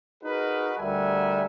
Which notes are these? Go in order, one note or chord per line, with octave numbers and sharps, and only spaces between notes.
D#4 F#4 G#4 A#4 B4
D2 G3 A#4 E5 F#5 G#5